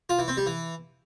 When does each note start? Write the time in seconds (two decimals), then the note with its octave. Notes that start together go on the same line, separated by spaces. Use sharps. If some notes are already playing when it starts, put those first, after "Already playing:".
0.09 F4
0.19 E3
0.28 C4
0.37 G3
0.46 E3